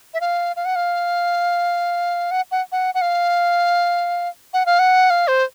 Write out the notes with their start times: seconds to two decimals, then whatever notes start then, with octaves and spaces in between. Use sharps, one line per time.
0.14 E5
0.21 F5
0.56 F5
0.65 F#5
0.76 F5
2.31 F#5
2.51 F#5
2.72 F#5
2.95 F#5
3.01 F5
4.53 F#5
4.66 F5
4.79 F#5
5.10 F5
5.28 C5